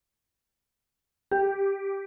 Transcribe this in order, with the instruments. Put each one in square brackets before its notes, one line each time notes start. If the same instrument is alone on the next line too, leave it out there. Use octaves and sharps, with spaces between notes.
[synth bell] G4